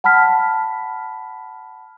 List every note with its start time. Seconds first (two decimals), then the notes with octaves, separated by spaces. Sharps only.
0.04 F#5 A5 B5 F6 B6